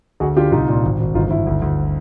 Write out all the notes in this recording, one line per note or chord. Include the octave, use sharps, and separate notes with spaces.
D2 F#4 G#4
D3 F4 G4
C2 D#4 F4
A#2
G#1
G#1
G1 D#4 F4
G1 E4
D2
D2